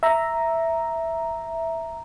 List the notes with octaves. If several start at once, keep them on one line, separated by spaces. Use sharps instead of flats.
E5 A#5